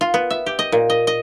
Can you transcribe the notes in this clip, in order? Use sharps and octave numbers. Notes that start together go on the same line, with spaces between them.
F4
B3
E5
G4
D#5
A#2
D#5
D#5